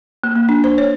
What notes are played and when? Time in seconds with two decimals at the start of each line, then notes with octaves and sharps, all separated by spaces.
0.24 A#3
0.36 A#3
0.49 D4
0.64 C5
0.78 C#5